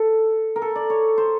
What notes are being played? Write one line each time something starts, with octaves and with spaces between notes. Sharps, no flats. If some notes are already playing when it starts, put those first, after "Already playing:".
Already playing: A4
A#4
A4
D5
C#5
C5